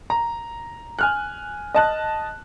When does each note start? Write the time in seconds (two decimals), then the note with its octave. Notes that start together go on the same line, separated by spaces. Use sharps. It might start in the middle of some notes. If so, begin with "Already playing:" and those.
0.10 A#5
0.99 G#5 F6 F#6
1.74 D#5 A5 F#6